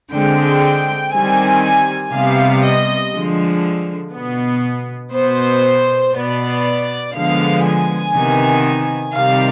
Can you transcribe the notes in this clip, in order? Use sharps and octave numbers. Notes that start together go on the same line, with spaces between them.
D3 G#3 C4 G5
D#3 G3 C4 G#5
C3 G3 B3 F5
D#5
D3 F3 G#3
B2 B3
B2 B3 C5
B2 B3 D5
D3 F3 G#3 B3 F5
G#5
C3 D#3 B3
C3 D#3 G3 F5